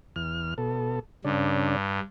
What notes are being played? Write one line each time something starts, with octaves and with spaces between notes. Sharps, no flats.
E2 F6
B2 A4
G2 C#3 D4